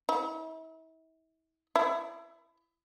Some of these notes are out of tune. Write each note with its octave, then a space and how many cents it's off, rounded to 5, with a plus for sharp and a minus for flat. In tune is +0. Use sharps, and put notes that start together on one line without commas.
E4 -40
E4 +25